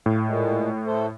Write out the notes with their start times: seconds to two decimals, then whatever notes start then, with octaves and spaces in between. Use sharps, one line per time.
0.06 A2 F5
0.27 A#2 G#3
0.87 A3 A4 C5